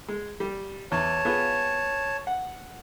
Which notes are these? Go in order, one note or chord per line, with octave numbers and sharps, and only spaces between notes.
G#3
G3
E2 C#5 A5
B3 F4 G#4
F#5